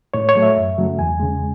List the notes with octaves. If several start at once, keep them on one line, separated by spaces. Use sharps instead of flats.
A2 C#5
C#5
F#3 A3
E5
F#2
C#3 F#3 A3
E2 G#5
C#3 G#3